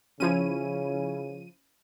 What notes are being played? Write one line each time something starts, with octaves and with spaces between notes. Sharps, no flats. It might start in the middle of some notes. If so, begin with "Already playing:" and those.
C#3 F3 C#4 E4 C#5 D#7